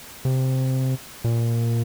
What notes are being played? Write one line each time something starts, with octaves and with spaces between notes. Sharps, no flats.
C3
A#2